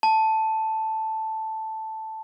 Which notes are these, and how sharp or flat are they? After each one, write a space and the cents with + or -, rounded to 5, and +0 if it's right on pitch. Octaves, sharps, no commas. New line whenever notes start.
A5 +0